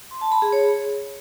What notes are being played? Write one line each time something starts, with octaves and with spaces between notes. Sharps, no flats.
C6
A5
B5
G#4
C#5